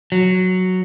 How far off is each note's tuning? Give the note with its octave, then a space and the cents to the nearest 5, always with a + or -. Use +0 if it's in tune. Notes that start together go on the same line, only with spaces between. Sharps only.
F#3 +0